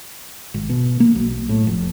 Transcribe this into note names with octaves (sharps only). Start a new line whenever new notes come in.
G#1
B2
A#3
B1
A2
F1